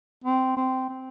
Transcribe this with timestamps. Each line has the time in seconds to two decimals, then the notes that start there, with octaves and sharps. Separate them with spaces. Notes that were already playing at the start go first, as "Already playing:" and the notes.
0.24 C4
0.57 C4
0.89 C4